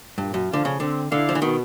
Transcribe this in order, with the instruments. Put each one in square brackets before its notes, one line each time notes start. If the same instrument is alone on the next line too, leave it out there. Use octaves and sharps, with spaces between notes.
[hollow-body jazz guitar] G2 [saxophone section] A#2
[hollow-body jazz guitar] F#2
[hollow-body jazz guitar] D3 [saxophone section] F3 A3 D4 F4
[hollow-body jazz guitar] C#3
[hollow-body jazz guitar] D3 [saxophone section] C4
[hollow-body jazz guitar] D3 [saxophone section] E4 A4 D5 F5
[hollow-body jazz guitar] F3
E3
[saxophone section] B2 [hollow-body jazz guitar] D#3